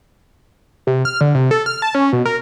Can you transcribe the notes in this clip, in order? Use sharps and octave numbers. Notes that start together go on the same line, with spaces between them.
C3
F6
D3
C3
A4
F6
A5
C#4
B2
A#4